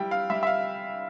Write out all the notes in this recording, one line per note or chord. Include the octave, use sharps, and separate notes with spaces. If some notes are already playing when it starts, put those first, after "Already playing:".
Already playing: G3 E4 G5
F5
G3 E5
E5
F5